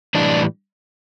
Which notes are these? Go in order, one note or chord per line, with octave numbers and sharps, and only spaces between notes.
A2 E3 G3 D4